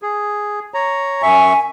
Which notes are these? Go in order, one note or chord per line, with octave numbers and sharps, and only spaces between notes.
G#4
C#5 A#5
F#2 E5 G#5 C#6